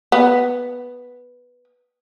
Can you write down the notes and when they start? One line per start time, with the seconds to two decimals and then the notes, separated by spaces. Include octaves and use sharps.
0.12 B3